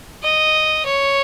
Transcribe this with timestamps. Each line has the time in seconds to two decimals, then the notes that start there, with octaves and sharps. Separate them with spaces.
0.23 D#5
0.85 C#5